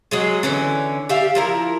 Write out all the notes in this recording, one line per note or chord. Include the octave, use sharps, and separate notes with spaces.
F#3 G#3 G#4
D3 E3 C#4
G4 D5 E5 F5
F3 E4 A#4